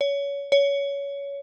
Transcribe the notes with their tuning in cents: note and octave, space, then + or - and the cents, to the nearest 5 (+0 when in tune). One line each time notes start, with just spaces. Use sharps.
C#5 +25
C#5 +20